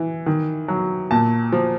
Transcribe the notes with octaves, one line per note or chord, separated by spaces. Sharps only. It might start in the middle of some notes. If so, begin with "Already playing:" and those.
Already playing: E3
D#3
F#3
A#2 A5
F3